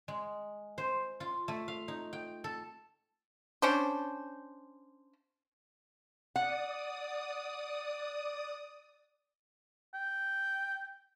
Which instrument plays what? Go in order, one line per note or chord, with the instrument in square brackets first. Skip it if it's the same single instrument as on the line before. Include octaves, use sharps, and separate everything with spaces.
[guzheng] G#3
C5
F4
A3
F5
D#4
G5
A4
[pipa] C#4 D4 C5
[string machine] D5 D#6 [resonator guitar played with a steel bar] F#5
[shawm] G5